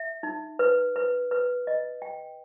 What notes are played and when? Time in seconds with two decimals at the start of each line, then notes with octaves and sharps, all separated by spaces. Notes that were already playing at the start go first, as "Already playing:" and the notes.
Already playing: E5
0.23 D#4
0.59 B4
0.96 B4
1.31 B4
1.67 D#5
2.02 G5